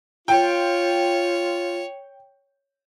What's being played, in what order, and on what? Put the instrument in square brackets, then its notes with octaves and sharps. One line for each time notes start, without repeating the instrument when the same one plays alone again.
[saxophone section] F4 [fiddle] C#5 [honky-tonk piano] G5